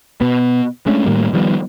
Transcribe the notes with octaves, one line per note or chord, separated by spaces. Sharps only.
B2 B3
G#3 A3 C#4 D4
A2 D#3 G3 A#3
D#3 F3 G3 B3